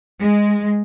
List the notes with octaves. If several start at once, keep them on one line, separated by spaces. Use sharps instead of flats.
G#3